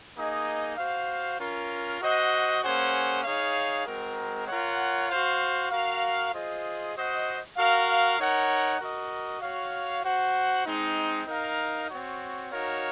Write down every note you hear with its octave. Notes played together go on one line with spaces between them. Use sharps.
A#3 D#4 G#4 D#5
F#4 C5 F5
C#4 F4 A#4
F#4 C5 D#5 F#5
A#3 C#4 G#4 C5 F#5
D#4 G#4 C#5 F5
G#3 C4 F#4 A#4
F4 A#4 C#5 F#5
F#4 C5 F5
F#4 A#4 F5
F4 G#4 C5 D#5
F#4 C5 D#5 F#5
F#4 A#4 F5
D#4 A#4 C#5 F#5
F#4 A#4 D#5
F#4 C#5 F5
F#4 C5 F#5
G#3 C4 D#4
D#4 A#4 F5
C4 F#4 C#5
D#4 F#4 A#4 C#5 F5